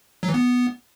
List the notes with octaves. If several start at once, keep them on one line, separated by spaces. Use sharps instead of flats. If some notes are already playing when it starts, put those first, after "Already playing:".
F#3
E3
B3